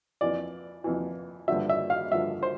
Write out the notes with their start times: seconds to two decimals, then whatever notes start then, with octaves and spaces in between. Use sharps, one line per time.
0.21 F2 E3 D5
0.84 F2 E3
1.48 G2 D3 F3 E5
1.69 E5
1.90 F5
2.11 G2 D3 F3 E5
2.43 C5